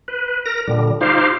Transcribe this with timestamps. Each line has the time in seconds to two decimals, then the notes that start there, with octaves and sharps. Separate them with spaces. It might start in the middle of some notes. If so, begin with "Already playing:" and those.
0.08 B4
0.46 A#4 A#6
0.67 A#2 D3 G3
1.01 D#4 F4 G4 C5 F5